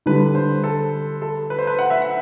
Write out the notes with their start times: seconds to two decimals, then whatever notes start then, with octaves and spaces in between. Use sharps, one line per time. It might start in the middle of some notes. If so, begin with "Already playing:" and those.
0.06 D3 G3 D4 B4
0.35 C5
0.64 A4
1.22 A4
1.50 B4
1.59 C5
1.67 B4
1.79 F#5
1.90 E5
2.02 F#5